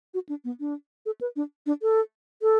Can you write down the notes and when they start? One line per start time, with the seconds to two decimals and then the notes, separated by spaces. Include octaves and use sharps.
0.14 F#4
0.29 D4
0.44 B3
0.60 D4
1.06 A4
1.21 B4
1.36 D4
1.66 D4
1.82 A4
2.42 A4